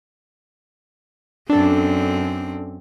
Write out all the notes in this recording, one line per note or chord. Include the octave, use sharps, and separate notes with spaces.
F#2 C4 D4 A4